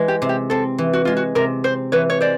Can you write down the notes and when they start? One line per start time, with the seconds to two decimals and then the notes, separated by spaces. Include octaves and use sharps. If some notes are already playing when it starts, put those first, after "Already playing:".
Already playing: E3 G#3
0.08 G4
0.22 C3
0.29 G4
0.50 C4 A4
0.78 E3
0.93 F#4
1.05 G#3 F4
1.17 F#4
1.35 C3 A#4
1.64 C4 C5
1.92 E3 B4 C#5
2.10 C#5
2.21 G#3 C5 D5